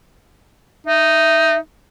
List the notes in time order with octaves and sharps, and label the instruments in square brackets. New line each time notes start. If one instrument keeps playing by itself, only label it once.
[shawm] D#4 [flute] E5